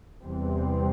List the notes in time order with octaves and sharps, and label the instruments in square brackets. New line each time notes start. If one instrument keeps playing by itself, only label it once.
[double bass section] E2 C3 E3 G3 C4